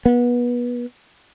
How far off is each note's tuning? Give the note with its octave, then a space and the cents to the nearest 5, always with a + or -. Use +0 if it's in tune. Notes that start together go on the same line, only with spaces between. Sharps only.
B3 -25